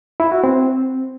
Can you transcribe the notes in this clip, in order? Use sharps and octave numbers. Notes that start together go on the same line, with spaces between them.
E4
F#4
C4